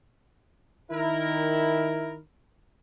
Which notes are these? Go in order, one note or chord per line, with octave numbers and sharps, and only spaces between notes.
D#3 E4 A#4